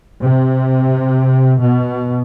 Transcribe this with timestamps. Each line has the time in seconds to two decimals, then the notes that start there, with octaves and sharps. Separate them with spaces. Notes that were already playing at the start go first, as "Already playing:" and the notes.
0.22 C3
1.61 B2